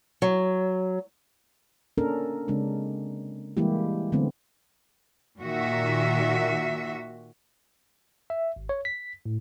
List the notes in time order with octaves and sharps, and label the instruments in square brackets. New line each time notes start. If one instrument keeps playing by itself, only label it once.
[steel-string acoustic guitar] F#3
[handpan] A#3 C#4 D4 A4 A#4
C#3 G#3 C4 D4
E3 G3 G#3 A#3 E4 G4
D3 F#3 A3 B3 C4
[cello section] A#2 D#3 F#4 E5
[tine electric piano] E5
G#1
C#5
B6
A2